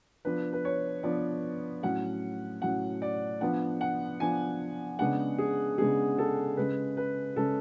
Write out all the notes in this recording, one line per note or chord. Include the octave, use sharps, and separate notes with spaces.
F3 B3 D4 B4
B4
C#5
F3 B3 D4 D5
A2 F#3 C#4 F#5
A2 F#3 C#4 F#5
D5
F3 B3 D4 F#5
F#5
F3 B3 D4 G#5
C#3 G#3 B3 D4 F#5
G#4
C#3 G#3 B3 D4 G#4
A4
C#3 G#3 C#4 B4
B4
C#3 G#3 C#4 A4